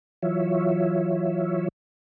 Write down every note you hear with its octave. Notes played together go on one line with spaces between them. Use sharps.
E3 F#3 F4 C#5 E5